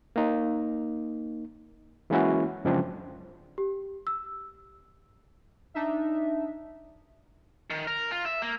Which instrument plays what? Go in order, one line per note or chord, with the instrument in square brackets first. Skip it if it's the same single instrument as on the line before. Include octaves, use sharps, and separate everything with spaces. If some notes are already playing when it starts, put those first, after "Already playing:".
[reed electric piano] A#3 D#4
E3 G#3 A#3 C#4 E4 F#4
F#2 C#3 F3 G#3 C4 D4
[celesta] G4
E6
[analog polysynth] D4 D#4 E5
[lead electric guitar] D#3
A#4
F4
E5
A#3